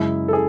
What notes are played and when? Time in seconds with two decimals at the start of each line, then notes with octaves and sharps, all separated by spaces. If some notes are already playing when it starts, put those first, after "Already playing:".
Already playing: F#2 C#3 G#3 E4
0.28 A4
0.33 G#4